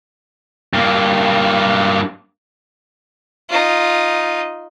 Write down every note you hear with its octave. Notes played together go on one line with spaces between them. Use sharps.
G2 A#3
D#4 F4